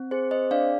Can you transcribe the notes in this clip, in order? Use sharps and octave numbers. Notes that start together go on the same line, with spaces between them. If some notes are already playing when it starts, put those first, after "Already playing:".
Already playing: C4
G#4 C5
C5 D#5
D4 D5 F5